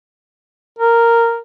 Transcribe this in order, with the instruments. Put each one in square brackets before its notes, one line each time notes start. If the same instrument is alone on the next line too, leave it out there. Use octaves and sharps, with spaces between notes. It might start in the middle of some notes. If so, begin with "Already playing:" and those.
[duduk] A#4